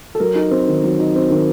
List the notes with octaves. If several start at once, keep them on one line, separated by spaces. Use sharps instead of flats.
A4
F#3 A#4
D#4
C4
D#3
F#3
D#4
C4
D#3